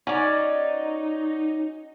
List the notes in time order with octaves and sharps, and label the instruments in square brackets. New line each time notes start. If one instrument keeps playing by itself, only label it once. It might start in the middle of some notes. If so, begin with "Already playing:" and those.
[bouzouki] C#4 F#4 D5 [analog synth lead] D#4